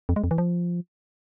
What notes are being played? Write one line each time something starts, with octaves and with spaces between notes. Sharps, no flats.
F2
G#3
F2
E3
F3